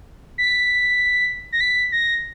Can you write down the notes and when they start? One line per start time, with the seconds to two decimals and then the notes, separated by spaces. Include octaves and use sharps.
0.38 B6
1.53 A#6
1.61 B6
1.92 A#6